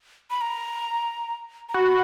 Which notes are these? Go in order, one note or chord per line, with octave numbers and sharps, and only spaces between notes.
B5
A#5
A#5
F#4 B5